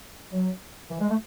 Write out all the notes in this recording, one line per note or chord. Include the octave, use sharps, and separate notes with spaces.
F#3
E3
G#3
A3